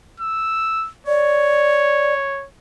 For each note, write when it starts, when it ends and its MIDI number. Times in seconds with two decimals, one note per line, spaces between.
0.20 0.89 88
1.07 2.46 73
1.07 2.13 74